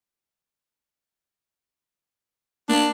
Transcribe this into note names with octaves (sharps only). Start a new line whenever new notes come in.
A#3 D4